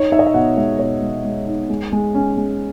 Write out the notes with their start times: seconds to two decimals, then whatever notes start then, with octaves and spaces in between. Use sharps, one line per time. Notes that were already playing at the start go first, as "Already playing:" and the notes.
Already playing: D#4 C#5
0.12 D#4 E5
0.19 D#5
0.27 E5
0.34 B2 F#5
0.57 G#3 E5
0.79 B2 C#5
1.02 G#3
1.25 G#3
1.47 D#4
1.70 G#3
1.92 G#3
2.15 C#4
2.37 G#3